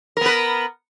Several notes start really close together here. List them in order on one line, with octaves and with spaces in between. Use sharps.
A#4 B3 B4